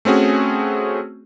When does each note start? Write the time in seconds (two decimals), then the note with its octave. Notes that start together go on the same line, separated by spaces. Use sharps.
0.05 A3 C4 C#4 F#4 G#4